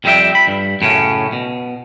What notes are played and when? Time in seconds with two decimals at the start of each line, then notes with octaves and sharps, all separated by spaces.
0.04 F2 G3 C4 D#4 E5 G5
0.35 B5
0.48 G2
0.81 F#2 A2 C#3 C#4
1.33 B2